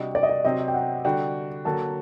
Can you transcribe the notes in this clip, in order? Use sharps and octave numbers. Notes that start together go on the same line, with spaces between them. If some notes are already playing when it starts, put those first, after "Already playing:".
Already playing: C3 G3 D4 F#4 D#5
D5
D#5
D5
C3 F#3 C4 D#5
G5
F#5
D3 G3 D4 F#4 G5
D3 F#3 A#3 F#4 A5